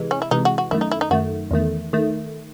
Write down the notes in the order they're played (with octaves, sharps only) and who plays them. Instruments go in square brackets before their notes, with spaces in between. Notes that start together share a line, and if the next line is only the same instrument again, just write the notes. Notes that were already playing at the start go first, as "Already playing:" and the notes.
Already playing: [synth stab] C3 E3 G#3
[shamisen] C#4
E4
[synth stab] C3 E3 G#3 [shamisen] D#4
[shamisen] F#4
F#4
[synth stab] F#2 D#3 A3 [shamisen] E4
[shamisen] D#4
E4
D#4
[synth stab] F#2 D#3 A3 [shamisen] F#4
[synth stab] E2 D#3 A3
D#3 A3